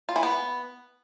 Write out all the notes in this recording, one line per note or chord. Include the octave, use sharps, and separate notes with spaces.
F4
E3
B3